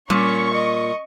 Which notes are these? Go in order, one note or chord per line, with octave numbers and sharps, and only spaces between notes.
A#2 G3 C#4 C#6
D#5